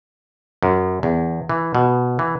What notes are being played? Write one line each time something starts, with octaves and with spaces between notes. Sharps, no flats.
F#2
E2
E3
B2
E3